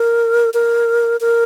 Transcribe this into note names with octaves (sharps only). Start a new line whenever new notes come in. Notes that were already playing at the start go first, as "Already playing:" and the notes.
Already playing: A#4
A#4
A#4